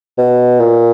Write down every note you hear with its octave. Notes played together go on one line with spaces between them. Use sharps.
B2
A#2